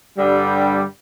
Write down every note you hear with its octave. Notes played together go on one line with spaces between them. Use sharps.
G2 D3 G3